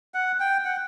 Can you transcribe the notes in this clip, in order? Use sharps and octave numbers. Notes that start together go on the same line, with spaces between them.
F#5
G5
F#5